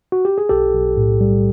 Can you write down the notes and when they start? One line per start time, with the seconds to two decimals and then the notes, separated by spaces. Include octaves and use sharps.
0.12 F#4
0.25 G4
0.38 G#4
0.49 B1 G4 A4
0.73 B1
0.97 A2
1.21 G3